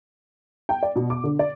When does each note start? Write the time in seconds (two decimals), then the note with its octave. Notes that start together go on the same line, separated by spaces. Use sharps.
0.69 G5
0.83 D5
0.96 B2
1.10 D6
1.24 D3
1.39 D5